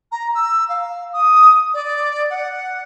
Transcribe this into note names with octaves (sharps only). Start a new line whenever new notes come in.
A#5
E6
F5
D#6
D5
F#5